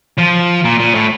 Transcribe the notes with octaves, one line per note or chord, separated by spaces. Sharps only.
F3
A#2
A#2
A2